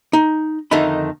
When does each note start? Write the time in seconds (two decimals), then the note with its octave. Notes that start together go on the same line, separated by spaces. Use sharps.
0.13 D#4
0.71 F2 D3 D#3 A3 D#4 B5